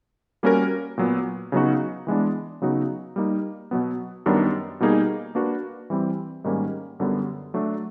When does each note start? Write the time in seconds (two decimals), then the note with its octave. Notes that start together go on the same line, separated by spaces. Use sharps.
0.43 G3 A#3 C#4 F#4 A#4
0.98 A#2 F#3 B3
1.52 C#3 F#3 B3 D#4 F#4
2.07 E3 G#3 B3 D4
2.62 C#3 F#3 B3 D#4 F#4
3.16 G3 A#3 D#4
3.71 B2 F#3 B3
4.26 F#2 D#3 G3 B3 D4
4.80 B2 G3 A#3 D#4 G#4
5.35 A#3 D4 F#4 B4
5.90 E3 G3 C4
6.44 G#2 D#3 G3 A#3 C#4
7.00 F#2 D3 G3 B3
7.54 F#3 A3 D4